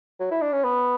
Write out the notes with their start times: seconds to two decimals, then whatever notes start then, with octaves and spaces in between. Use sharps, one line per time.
0.20 F#3
0.31 E4
0.42 D4
0.53 C#4
0.64 B3